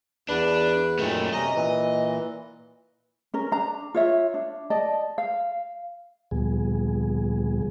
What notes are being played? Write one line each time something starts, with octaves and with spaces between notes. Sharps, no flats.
E2 D4 B4
F#2 A#2 D#3 A3 C#4
C3 C#4 D#5 A#5
A#2 E3
C#4 A#4
D4 A#5
F4 C#5 E5
D4
D5 D#5 A5
F5
D2 A#2 F3 G3 B3 G#4